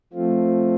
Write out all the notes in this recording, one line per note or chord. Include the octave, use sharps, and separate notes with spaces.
F3 A3 C4 F4